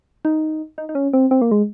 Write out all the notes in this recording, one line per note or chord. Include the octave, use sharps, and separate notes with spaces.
D#4
D#4
D#4
C#4
C4
C4
A#3
G#3